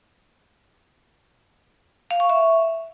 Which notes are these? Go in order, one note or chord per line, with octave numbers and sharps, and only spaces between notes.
F5
C#6
E5